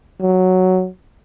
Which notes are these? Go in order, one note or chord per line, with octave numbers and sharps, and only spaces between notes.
F#3